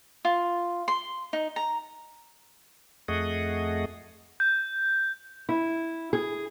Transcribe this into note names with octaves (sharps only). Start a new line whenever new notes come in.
F4
C6
D#4
A#5
F2 A3 G#4 D#5 F#5
G6
E4
G#4